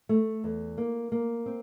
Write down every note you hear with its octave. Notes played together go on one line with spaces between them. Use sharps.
A3
E2
A#3
A#3
C4